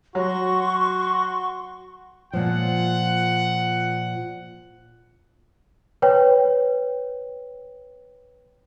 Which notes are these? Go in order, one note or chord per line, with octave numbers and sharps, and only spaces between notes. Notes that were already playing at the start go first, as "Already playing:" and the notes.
F#3 F#4 C6 C#6
A#2 F3 F#5
B4 C#5 G5